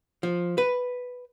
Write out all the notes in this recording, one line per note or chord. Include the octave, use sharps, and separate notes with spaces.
F3
B4